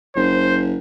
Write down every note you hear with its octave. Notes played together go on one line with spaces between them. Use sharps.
F#1 C5